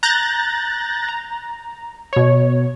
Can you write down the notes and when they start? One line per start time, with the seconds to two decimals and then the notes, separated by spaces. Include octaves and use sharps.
0.03 A#5 F#6 G6 A6 A#6
1.08 A#5
2.13 B2 C#5